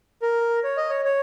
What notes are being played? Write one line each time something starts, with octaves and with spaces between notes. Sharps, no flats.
A#4
C#5
D#5
C#5
C#5